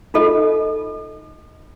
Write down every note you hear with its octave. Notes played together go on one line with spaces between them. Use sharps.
D#4 F4 A4 D#5